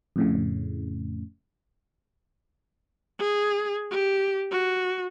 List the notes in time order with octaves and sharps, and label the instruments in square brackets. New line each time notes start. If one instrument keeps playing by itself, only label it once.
[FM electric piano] F2 A2 C#3
[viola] G#4
G4
F#4